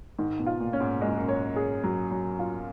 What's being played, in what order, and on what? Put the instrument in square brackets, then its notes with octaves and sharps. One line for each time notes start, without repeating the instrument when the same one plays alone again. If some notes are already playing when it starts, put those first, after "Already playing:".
[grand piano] G#2 [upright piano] D#3
[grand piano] B2
[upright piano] F4
[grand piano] A#2
[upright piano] C#4
[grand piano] G#2
[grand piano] F#2 [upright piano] G#3
[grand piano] G#2
F#2
[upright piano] C#5
G#4
F#3
F#3
F4